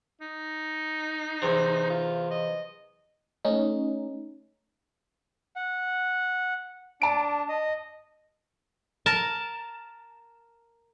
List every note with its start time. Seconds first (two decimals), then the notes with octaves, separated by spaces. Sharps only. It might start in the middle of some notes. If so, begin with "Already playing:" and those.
0.21 D#4
1.42 E2 C3
1.90 F4
2.31 D#5
3.45 A3 C#4 D#4
5.56 F#5
7.02 D4 A5 D7
7.49 D#5
9.06 A#4 A5